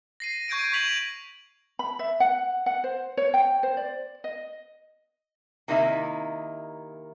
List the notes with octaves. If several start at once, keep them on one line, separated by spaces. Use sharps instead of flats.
A#6 C7 D#7
C#6 G6 G#6 A#6 D7 D#7
C#6 G#6 B6 F7 F#7
B5
E5
F#5
F#5
C5
C#5
G5
C5
D5
D#5
C3 D#3 A#3 D#4 E4 E5